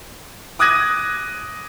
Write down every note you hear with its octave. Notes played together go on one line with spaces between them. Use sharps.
D6 D#6 F#6 G#6 A#6 D#7